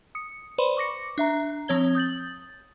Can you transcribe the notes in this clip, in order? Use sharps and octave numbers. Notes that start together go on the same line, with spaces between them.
D#6 C#7
B4 C5 D5 B5 C6
C#6 D6 A#6 C#7
D4 E5 A#5
F3 C4 C#5 G#6 G7
D#6 G6 A6 F#7